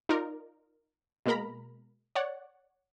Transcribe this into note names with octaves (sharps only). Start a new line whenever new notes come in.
D#4 F4 A#4 D5
B2 G#3 A#3 A#4 A#5 B5
C#5 D5 F#5